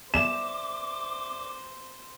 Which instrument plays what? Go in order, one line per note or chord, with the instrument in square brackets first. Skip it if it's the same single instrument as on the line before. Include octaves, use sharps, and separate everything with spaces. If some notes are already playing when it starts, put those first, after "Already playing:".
[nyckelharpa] C5 [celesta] D5 E5 [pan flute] D6 [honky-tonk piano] E7